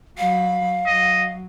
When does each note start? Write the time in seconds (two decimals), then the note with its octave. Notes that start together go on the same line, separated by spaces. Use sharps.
0.18 F#3 F5 B5
0.86 F#3 D#5